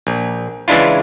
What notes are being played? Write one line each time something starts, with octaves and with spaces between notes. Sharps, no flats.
A#1
C#3 E3 G#3 D4 E4 F4